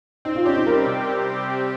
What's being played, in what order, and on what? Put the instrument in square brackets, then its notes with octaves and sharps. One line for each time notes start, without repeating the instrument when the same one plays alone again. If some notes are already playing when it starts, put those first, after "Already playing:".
[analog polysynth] C4 [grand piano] D#4
[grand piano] F4
[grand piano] C#4 [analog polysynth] G4
[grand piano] D#4
[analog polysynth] G3 [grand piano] A#4
[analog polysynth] C3